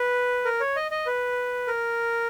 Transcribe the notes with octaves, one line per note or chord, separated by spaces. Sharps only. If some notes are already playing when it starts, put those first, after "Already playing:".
Already playing: B4
A#4
C#5
D#5
D#5
B4
A#4